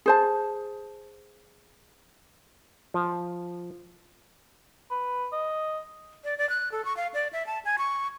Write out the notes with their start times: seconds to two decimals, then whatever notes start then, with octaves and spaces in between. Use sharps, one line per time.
0.06 G#4 C5 A5
2.94 F3
4.91 B4
5.33 D#5
6.24 D5
6.38 D5
6.49 F#6
6.72 A4
6.85 C#6
6.97 F5
7.14 D5
7.33 E5
7.47 A5
7.65 G#5
7.78 C#6